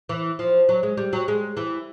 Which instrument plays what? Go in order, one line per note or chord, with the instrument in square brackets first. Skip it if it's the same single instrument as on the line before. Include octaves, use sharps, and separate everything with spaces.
[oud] E3
F3
F#3
G#3
G3
F#3
G#3
E3